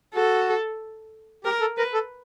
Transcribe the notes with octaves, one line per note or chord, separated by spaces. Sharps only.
F#4 A4
G4 A#4
A4
A#4 B4
A4